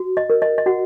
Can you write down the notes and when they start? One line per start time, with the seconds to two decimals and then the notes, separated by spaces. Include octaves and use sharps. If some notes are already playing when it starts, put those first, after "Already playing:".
Already playing: F#4
0.17 D#5
0.30 A#4
0.42 D#5
0.58 D#5
0.66 F#4 F#5